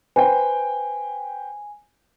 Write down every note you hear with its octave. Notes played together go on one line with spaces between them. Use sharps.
B4 C5 G5 G#5